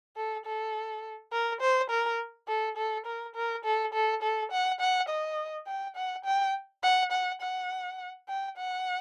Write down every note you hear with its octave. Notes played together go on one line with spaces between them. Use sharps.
A4
A4
A#4
C5
A#4
A4
A4
A#4
A#4
A4
A4
A4
F#5
F#5
D#5
G5
F#5
G5
F#5
F#5
F#5
G5
F#5